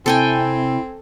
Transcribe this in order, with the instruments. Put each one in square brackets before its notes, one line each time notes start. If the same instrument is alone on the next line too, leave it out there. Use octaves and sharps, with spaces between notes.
[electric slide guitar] C3 [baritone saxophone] C4 [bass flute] E4 [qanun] A4 G5 G#5